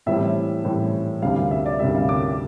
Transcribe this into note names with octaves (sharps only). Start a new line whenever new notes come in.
A2 E3 G3 C4 E5
A2 E3 G3 C4
D2 C3 G3 F5
F5
E5
D5
D2 C3 G3 E5
F5
D6